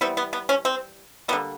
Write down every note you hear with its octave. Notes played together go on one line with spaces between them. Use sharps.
E3 G3 B3 C4
B3
B3
C#4
C4
D3 G3 A#3 B3